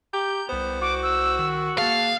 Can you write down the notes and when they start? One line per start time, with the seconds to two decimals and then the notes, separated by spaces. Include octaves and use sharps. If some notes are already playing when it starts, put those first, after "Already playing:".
0.13 G4 A#5 G6
0.49 C2 B3 C5
0.81 F#4 D6
1.03 E6
1.39 D#3
1.78 A#3 G#4 F5 A5